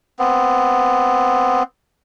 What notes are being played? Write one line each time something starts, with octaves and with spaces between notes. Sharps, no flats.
B3 C4